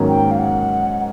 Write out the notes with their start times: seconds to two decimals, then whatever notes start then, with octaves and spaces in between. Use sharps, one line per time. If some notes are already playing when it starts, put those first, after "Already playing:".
Already playing: G#2 D#3 F#3 A#3 C#4
0.08 G5
0.31 F5
0.39 F#5